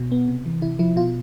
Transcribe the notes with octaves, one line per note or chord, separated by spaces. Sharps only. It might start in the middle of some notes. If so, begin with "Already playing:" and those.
Already playing: B2
B3
C3
E3
C3 E4
F3 E4
B2 F4